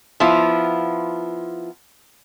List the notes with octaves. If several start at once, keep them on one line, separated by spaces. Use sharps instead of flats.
F3 B3 E4 F4